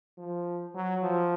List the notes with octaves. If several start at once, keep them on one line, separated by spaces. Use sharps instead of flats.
F3
F#3
F3